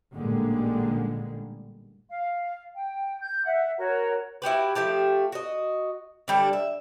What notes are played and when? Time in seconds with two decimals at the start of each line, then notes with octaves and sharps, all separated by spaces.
0.16 A1 A#2 D3 G3 G#3 A#3
2.09 F5
2.76 G5
3.20 G6
3.45 E5 F#5
3.78 F#4 A#4 C#5
4.42 E4 F#4 G4 B4
4.75 F3 A3 G4 A5
5.32 F#4 D#5
6.28 D3 G3 D4
6.53 E5